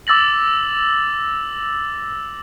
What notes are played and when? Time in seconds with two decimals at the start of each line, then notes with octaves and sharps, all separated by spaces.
0.07 D6 E6 A6 A#6 F#7